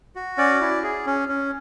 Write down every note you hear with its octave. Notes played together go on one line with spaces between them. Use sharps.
F#4
C#4 D5
E4
G#4
C#4
C#4